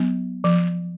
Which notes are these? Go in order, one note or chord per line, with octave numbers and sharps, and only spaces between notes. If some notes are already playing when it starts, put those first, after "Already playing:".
Already playing: F#3 B3 D4
F3